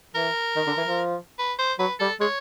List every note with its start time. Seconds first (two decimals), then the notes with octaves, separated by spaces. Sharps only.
0.15 E3 A#4
0.56 D#3
0.67 D3
0.77 E3
0.87 F3
1.39 B4
1.59 C5
1.79 F#3 B4
2.00 G3 A4
2.20 G#3 C#5